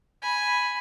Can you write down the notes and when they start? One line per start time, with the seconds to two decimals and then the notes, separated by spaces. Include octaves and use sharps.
0.22 G#5 B5